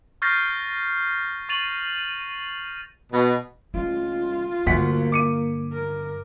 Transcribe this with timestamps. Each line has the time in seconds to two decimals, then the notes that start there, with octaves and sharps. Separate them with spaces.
0.22 C#6 F6 G6 A6 A#6 C7
1.49 C#6 A6 D#7 F7 F#7
3.12 B2
3.74 C#2 G#3 A3 F4
4.66 D2 G2 D3 A#3 F#5 B6
5.12 D6 C#7 D#7
5.72 A#4